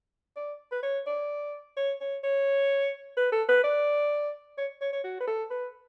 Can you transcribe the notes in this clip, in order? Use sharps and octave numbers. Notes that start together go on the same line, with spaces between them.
D5
B4
C#5
D5
C#5
C#5
C#5
B4
A4
B4
D5
C#5
C#5
C#5
F#4
B4
A4
B4